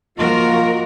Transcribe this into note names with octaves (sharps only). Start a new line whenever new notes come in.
F3 A#3 F4 F#4 A#4 D#5